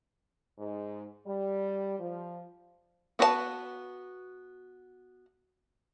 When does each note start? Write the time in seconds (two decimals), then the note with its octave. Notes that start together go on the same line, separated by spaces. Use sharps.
0.59 G#2
1.26 G3
1.99 F3
3.19 B3 F#4 B4 D5 A5